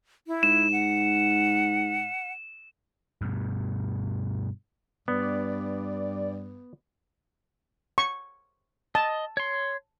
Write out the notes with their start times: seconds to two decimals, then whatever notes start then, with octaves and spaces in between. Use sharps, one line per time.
0.27 E4
0.43 G#2 E7
0.72 F#5
3.21 G2 B2
5.08 G2 B3 D5
7.98 C#6
8.95 D#5 A5
9.37 C#5 C6